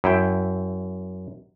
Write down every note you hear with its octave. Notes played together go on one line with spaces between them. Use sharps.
F#2 E4 G5